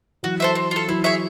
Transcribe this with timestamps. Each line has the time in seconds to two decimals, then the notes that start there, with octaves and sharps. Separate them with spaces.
0.23 E3 F#3 F#4
0.40 A4 C5 E5
0.55 C4
0.71 F4 A4
0.88 E3 F#3 E4
1.04 G#4 C#5 E5